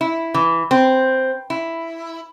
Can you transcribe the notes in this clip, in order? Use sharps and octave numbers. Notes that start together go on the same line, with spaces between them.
E4
E3
C4
E4